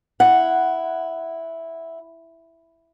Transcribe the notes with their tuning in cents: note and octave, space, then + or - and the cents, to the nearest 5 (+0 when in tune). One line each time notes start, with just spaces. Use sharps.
E4 +0 F#5 +0